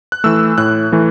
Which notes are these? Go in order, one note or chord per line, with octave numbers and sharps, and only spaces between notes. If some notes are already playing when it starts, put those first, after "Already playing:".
F#6
E3 A3 E6
A2 F#6
E3 A3